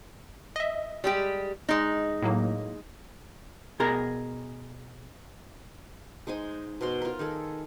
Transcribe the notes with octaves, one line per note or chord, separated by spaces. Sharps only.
D#5 E5
G3 G#3 G4
G#3 D#4
A2 F#3 A#3
B2 G#4 A#4 A#5
G#3 D#4 C5 G#5
B2 A#4 C5 C6
F4 A#4
D#3 G#4 A4